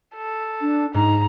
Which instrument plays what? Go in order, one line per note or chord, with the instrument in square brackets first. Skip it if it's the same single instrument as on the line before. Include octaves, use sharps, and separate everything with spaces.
[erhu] A4
[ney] D4
[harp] G#2 [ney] D#4 [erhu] A#5